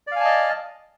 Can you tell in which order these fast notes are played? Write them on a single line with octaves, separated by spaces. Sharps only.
D5 F5 G#5 A5 D#5